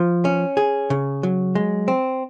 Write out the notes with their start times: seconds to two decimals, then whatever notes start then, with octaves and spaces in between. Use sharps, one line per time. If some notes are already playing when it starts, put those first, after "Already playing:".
Already playing: F3
0.25 C#4
0.57 G#4
0.90 C#3
1.23 F#3
1.55 G#3
1.88 C4